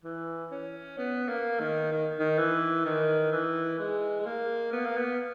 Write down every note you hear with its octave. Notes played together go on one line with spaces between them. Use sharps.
E3
C#4
B3
A#3
D#3
D#3
D#3
E3
D#3
E3
G#3
G#3
A#3
B3
A#3
B3